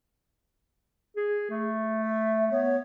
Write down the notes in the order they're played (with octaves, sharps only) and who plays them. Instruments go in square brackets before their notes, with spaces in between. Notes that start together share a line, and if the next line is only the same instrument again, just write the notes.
[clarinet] G#4
A3
[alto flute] E5
[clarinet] B3 [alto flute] C#5